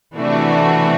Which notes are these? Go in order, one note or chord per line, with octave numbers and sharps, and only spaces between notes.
C3 E3 A3 D4 F#4